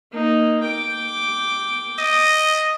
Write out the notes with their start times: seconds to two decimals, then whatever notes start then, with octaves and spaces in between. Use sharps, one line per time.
0.13 A#3 D#4
0.63 G5 D6
1.99 D#5